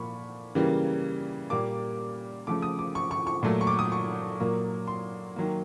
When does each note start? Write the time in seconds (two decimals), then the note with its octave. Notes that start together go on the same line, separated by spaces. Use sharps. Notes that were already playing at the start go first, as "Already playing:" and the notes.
Already playing: A#2 F3 A#3 B5 C#6
0.55 C#3 E3 G3 A#3
1.50 A#2 G3 A#3 D6
2.47 C#3 F3 A3 D6
2.62 D#6
2.79 D6
2.95 C#6
3.11 C#6
3.27 C#6
3.43 A#2 F#3 A3
3.61 C#6
3.67 D6
3.79 D#6
3.92 C#6
4.40 A#2 F#3 A#3
4.87 C6
5.36 D#3 F#3 A#3